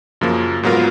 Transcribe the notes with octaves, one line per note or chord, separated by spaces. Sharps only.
F#2 C#3 F3 A#3
G#2 F#3 B3 F4 A#4